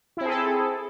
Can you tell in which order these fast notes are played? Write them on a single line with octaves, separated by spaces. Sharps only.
E4 C4 G#4 A4